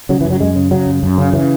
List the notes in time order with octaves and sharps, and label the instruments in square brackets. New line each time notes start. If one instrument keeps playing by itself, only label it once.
[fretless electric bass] C#3 F#3
F#2 E3
F#3
F#2 G#3
C#3
C#3 F#3
F#2
F#2
C#3
C#3 E3